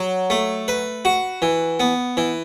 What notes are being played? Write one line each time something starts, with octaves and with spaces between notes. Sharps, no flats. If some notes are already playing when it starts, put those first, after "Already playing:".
Already playing: F#3
A3
B4
F#4
E3
B3
E3